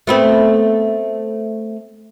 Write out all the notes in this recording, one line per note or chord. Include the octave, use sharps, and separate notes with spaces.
A3 B3 C4